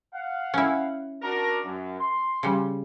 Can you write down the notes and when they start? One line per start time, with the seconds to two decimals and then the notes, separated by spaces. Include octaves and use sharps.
0.13 F5 F#5
0.54 C#4 E4
1.22 D4 F#4 A#4
1.64 F#2
1.99 C6
2.43 C#3 G3